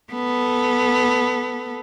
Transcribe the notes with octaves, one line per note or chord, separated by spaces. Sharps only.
B3 A4